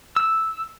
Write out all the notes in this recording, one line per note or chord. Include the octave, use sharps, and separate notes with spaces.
E6